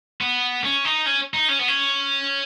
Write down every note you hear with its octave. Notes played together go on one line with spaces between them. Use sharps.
B3
C#4
D#4
C#4
D#4
C#4
B3
C#4